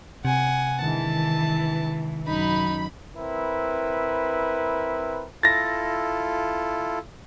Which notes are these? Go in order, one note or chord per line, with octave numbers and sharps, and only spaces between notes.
C3 F#5 G#5
D#3 E3 G#3 D4 A5
F#2 D#4 B5
C4 E4 A#4 B4
E4 F4 A4 A6 A#6